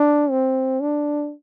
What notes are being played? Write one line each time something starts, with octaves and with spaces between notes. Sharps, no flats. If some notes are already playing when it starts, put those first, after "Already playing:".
Already playing: D4
C4
D4